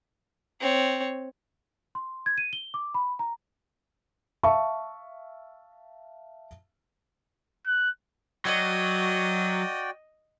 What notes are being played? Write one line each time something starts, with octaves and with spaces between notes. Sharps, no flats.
C4 C#5
C6
G#6
D#7
G7
D6
B5
A#5
E5 F5 A5 C#6
F#6
F#3 F#4 D5 D#5 G5